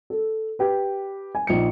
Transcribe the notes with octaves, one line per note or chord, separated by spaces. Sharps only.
A4
G4 B4
G#5
A#1 D#4 C#7